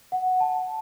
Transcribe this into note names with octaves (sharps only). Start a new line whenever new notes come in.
F#5
A5